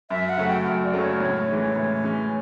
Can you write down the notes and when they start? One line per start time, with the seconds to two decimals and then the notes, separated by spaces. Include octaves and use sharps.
0.10 F#2 E5
0.29 F#5
0.37 C#3 F#3 A3
0.48 G5
0.65 F#2
0.84 D5
0.93 C#3 F#3 A3
1.02 C#5
1.21 A2 C#5
1.48 E3 G#3 C#4
1.76 A2
2.04 E3 G#3 C#4